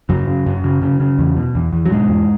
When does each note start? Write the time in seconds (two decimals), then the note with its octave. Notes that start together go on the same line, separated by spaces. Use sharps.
0.09 F#2 C#3 F#3
0.27 F#2
0.46 F#2
0.64 C#3
0.82 C#3
1.00 C#3
1.19 E2
1.37 B2
1.55 E2
1.73 E2
1.85 F#3
1.91 G#2 B2 G#3
2.09 E2